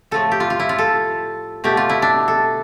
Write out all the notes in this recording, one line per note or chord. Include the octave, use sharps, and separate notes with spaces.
A2 F3 A3 A4
G4
F4
F4
E4
F4
A4
B2 A3 G4
F4
E4
D4
A4